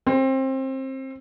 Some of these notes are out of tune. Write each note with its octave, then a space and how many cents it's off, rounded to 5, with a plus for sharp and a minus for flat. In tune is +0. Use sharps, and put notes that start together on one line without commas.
C4 +25